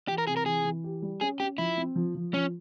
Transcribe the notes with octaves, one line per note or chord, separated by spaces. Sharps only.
E3 G4
A#4
C3 G#4
A#4
E3 G#4
E3
G4
G3
C#4 G#4
C#4 G4
F3 E4
C4
F3
F3
F3 C#4